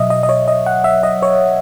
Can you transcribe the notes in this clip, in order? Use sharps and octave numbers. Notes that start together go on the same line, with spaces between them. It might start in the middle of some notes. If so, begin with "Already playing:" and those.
Already playing: B2 F#3 D#5 E5
D#5
D#5
C#5
D#5
F#5
E5
D#5
C#5